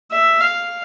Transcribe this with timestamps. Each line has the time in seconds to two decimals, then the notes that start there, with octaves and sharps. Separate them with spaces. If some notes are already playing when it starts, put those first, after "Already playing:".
0.12 E5
0.40 F5